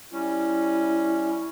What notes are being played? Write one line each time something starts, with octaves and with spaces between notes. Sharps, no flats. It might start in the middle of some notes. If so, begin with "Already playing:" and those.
G3 C#4 E4